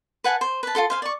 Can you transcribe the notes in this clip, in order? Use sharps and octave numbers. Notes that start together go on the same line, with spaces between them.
B4 F#5 G#5 A5
C5
B4 A5
F4 F#4 A4 C6
C5 F5 G#5
D5 C#6